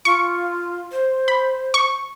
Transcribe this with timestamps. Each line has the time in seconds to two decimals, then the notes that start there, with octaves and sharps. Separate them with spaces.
0.05 F4 C#6
0.92 C5
1.28 B5
1.74 C#6